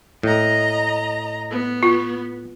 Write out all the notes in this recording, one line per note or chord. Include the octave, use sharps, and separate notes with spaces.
A2 D#5 A#5
B3
F4